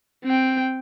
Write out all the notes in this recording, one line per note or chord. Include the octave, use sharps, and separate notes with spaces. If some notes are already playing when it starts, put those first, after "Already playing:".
C4 G5